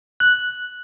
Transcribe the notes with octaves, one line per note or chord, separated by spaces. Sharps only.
F#6